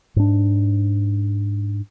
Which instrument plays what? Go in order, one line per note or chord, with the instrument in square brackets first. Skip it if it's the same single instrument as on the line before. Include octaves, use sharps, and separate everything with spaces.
[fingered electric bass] G#2 D4